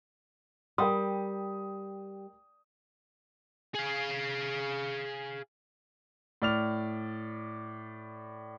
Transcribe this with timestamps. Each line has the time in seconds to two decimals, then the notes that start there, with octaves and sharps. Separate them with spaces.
0.78 G3 A#4 G5 D#6
3.75 G#4 F5
6.42 A2 D5 F6 F7